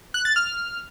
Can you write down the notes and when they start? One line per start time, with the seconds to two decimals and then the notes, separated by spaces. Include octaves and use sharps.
0.14 F#6
0.25 A6
0.36 F6